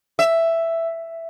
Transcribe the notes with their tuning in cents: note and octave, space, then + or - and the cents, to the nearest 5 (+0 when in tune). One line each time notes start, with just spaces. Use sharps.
E5 +5